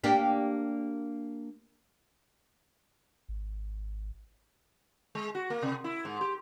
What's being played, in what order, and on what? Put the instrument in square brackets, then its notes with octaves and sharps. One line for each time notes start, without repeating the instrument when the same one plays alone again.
[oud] A#3 D4 G4
[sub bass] G#1
[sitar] G#3
F#4
A#3
C3
E4
G#2
G4